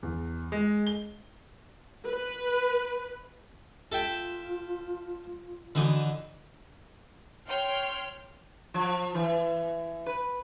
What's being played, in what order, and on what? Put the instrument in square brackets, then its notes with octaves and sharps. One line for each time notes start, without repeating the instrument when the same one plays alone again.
[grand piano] E2
G#3
G7
[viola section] B4
[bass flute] F4 [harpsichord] A4 E5 G5
[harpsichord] D3 E3 D#4 [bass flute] F#4
[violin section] C#5 G5 C6 F6
[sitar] F3
E3
B4